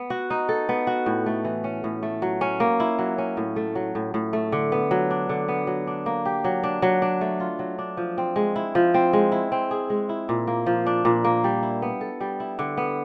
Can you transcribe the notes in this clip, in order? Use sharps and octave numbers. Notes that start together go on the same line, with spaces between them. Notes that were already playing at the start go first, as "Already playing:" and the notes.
Already playing: B3
F#4
D#4
A4
B3
F#4
A2
A3
E3
C#4
A2
A3
F#3
C#4
A#3
E4
F#3
C#4
A2
A3
F#3
A2
A2
A3
D3
B3
F#3
D4
D3
B3
F#3
D4
A#3
G4
F#3
D4
F#3
D4
A3
F4
F#3
D4
F3
C4
G#3
E4
F3
C4
G#3
E4
C4
G#4
G#3
E4
A#2
A#3
F3
D4
A#2
A#3
G3
E4
B3
A4
G3
E4
D3
B3